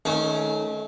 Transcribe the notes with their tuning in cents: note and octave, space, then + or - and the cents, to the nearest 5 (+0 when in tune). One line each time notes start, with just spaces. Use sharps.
D#3 +0 A3 -30 C#4 +0